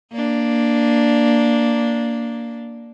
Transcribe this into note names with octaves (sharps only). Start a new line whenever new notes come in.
A#3 D4